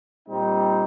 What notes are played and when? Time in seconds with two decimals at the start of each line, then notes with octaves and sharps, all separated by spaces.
0.27 A#2 G3 C4 D#4